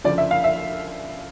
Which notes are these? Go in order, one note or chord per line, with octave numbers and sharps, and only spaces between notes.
D2 C#3 F3 D5
E5
F5
E5